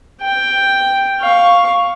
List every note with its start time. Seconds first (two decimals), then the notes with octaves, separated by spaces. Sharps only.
0.22 G5
1.21 F5 C#6